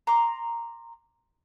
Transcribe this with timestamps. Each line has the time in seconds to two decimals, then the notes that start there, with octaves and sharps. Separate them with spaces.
0.07 A#5 C6 D6